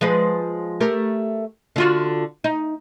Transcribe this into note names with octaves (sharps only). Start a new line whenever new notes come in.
F3 G#3 B4
A3 G4 A#4
D3 F4 F#4
D#4